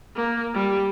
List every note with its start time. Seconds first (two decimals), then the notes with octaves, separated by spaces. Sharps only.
0.15 A#3
0.54 G3